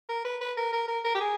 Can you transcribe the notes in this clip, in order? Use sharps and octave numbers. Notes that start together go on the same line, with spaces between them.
A#4
B4
B4
A#4
A#4
A#4
A#4
G4
G#4